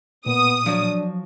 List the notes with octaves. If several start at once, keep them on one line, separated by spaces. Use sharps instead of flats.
A#2 B3 D#6
F3 F#3 D4